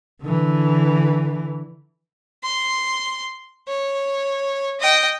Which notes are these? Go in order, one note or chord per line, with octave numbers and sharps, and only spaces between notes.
D3 E3
C6
C#5
D#5 G5